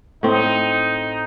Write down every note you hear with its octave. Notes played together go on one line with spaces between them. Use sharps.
A2 C4 D#4